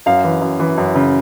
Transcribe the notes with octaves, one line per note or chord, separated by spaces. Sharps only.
F#2 F5
E3
F#2
E3
F#2
C#3